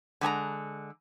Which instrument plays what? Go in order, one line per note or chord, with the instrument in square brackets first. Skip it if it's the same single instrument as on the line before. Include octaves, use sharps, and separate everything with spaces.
[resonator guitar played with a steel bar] D3 G#3 G#5 A#5